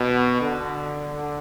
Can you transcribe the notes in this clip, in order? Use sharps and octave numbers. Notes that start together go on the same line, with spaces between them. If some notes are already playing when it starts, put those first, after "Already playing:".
Already playing: B2
D3